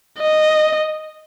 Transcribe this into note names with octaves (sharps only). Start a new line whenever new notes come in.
D#5